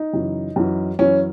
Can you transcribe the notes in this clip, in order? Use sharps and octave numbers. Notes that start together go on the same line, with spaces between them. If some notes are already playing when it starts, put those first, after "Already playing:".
Already playing: D#4
F#2 C#3 E3
F#2 E3
F#2 E3 C#4